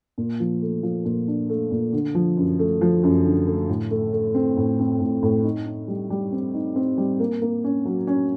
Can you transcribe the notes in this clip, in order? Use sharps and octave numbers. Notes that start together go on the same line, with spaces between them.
A#2
F3
A3
F3
A#2
D4
A3
A#2
D3
F3
F#2
A3
F3
F#2
D3
A3
A2
A3
A3
C4
A2
C4
A2
A2
D#4
D#4
G3
G3
C4
D#4
C4
G3
A#3
A#3
C#4
F#3
C#4